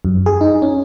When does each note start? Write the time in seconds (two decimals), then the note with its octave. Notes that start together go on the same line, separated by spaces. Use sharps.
0.05 F#2
0.26 G#4
0.41 D#4
0.62 C#4